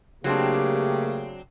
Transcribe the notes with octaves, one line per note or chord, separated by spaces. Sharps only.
C#3 F#3 A3 A#3 C4 D4 G4